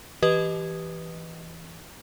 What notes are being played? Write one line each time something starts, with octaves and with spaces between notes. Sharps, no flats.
E3 G4 B4 D#5 D#6 G#6